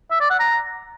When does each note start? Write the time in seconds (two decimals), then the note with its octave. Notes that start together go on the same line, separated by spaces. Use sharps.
0.11 E5
0.20 D5
0.30 F#5
0.40 A#5